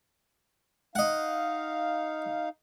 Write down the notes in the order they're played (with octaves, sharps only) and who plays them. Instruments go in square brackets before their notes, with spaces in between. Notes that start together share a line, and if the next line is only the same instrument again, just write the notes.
[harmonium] D#4 F5 [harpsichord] D#5 F#5